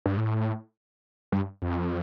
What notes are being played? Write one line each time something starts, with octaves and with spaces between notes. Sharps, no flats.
G2
A2
G2
F2